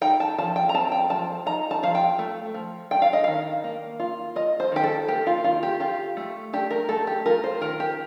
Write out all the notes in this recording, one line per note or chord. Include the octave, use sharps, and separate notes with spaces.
D#4 G5
A5
F3 A5
G5
A#5
C4 A5
G5
F3 A5
D#4 A#5
A5
F3 F5
G5
A3
F3
D4 G5
F5
D#5
D#3 F5
A#3
F4
F4 D#5
C5
D#3 G4
A4
A#3 G4
F4
D#3 F4
G4
F4 G4
A3
D4 G4
A#4
A3 A4
G4
F4 A#4
C5
D#3 A#4
G4